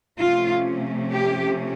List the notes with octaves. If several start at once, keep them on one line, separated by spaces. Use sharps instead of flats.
C3 F3 A3 C#4 F4
G4